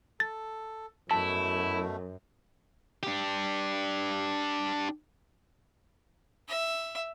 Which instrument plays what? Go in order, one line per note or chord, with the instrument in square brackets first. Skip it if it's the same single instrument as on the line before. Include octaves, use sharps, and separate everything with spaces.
[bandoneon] A4 [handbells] A6
[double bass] F#2 [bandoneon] B2 A3 [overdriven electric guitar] E4 [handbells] A5
[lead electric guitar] D4 G4
[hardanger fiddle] E5